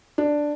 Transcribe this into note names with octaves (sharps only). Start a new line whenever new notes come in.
D4